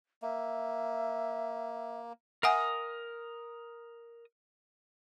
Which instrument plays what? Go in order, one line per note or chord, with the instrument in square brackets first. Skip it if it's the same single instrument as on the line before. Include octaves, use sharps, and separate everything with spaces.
[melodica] A#3 [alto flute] E5
[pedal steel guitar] A#4 D#6 [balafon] E5 F#5 G#5